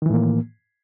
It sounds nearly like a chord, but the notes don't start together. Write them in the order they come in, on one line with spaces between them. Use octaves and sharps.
D#3 E3 A2 A#3